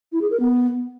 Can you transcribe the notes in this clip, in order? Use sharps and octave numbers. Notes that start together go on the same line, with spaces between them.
E4
G#4
A#4
B3